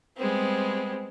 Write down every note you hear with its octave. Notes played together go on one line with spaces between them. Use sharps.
G3 G#3 B3 C4